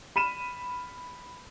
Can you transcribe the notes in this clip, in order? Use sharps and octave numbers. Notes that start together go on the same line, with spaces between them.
B5 F6 D#7 E7